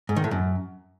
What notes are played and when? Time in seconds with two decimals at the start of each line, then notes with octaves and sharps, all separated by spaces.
0.09 G#2
0.16 D#3
0.24 A2
0.31 F#2